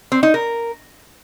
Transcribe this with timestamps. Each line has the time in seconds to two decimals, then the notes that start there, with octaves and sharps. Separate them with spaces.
0.12 C4
0.23 D#4
0.34 A#4